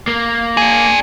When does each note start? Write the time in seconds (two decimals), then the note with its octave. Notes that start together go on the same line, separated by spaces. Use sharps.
0.08 A#3
0.57 D4 G#4